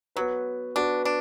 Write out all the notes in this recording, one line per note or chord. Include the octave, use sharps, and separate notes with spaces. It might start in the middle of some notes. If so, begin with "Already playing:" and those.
F#3 B3 F#4 B4
B3 D4 F#4 B4
D4